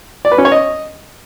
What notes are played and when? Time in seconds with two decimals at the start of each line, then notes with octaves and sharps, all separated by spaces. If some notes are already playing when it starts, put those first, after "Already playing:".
0.25 D5
0.32 B4
0.38 C#4
0.45 C#5
0.52 D#5